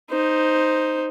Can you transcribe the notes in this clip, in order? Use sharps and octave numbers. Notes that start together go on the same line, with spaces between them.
D#4 C5